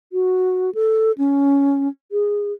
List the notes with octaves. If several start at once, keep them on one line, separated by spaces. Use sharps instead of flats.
F#4
A4
C#4
G#4